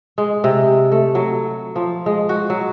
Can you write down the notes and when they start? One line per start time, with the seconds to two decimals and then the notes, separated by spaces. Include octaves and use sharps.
0.18 G#3
0.44 C3
0.92 A3
1.15 F#3
1.76 F3
2.06 G#3
2.29 F#4
2.50 F#3